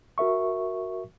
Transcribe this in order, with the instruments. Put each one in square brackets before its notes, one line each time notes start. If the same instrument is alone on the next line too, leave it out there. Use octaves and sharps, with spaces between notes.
[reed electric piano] F#4 A#4 E5 C#6